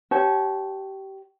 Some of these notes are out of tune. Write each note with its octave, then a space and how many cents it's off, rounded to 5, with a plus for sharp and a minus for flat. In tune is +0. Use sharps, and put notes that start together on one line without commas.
G4 -20 C#5 -5 A5 -30